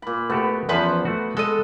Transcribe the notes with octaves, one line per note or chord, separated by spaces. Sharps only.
A#2 B5
A3 B3 F#4 G4
E2 F3 C#4 B4 C5 F#5
A3 F#4
G#3 A4 D#5